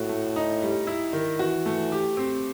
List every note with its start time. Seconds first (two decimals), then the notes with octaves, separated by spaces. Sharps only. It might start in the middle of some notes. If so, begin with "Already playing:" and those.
Already playing: A2 F#4
0.09 A3
0.36 D#4
0.62 G3
0.87 E4
1.13 D#3
1.39 E3 F#4
1.66 A3
1.92 G4
2.17 C4